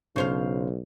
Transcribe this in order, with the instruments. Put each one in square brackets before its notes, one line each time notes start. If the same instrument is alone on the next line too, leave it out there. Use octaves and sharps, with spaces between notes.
[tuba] B1 [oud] C#3 C5 F5